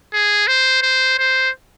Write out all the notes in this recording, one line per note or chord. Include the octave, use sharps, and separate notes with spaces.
G#4
C5
C5
C5